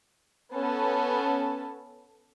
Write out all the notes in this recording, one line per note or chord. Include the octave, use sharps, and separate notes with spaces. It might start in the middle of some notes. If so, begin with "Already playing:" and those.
B3 C#4 A4 A5